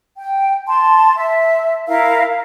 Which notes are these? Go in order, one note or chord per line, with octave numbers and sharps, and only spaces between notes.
G5
A5 C6
E5
E4 A#4 E5 F5